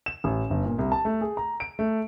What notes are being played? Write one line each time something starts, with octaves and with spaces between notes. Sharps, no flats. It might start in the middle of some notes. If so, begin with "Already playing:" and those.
E7
A1
G1
A#2
C2
A5
A3
G#4
A#5
D7
A3